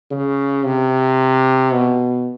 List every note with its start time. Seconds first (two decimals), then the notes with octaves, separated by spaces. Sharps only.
0.11 C#3
0.65 C3
1.73 B2